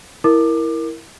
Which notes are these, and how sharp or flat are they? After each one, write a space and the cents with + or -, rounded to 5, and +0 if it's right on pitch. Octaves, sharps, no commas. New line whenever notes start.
E4 +0 A#4 +0 D6 +25